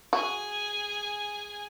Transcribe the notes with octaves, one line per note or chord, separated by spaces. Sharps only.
F#4 G#4 G#5